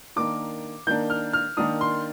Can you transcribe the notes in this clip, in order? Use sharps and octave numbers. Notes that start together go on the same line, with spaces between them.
D#3 A#3 D4 D6
D#3 A#3 D4 G6
F6
F6
D#3 A#3 D4 D#6
C6